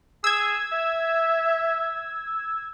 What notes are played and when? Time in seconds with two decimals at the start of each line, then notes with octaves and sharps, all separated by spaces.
0.24 G#4 E6 G#6
0.73 E5